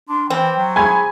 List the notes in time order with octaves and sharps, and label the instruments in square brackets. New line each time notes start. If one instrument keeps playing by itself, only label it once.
[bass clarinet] D4 [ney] C6
[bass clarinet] E3 [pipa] C4 [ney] G5
[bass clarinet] F#3
[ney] G#4 [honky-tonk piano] G#5 B5 G#6